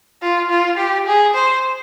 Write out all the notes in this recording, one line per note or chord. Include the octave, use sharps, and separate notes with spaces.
F4
F4
G4
G#4
C5